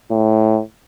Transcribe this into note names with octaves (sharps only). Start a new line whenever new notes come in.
A2